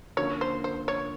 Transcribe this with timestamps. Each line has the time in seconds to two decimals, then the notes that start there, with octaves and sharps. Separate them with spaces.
0.17 D3 F3 A#3 C#4 C#5
0.41 C5
0.64 C5
0.88 C#5